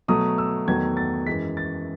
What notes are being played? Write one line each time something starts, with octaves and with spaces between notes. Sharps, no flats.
B2 F#3 A3 D#6
E6
E2 D#3 F#3 A3 G#6
A6
F#2 E3 G#3 B6
A6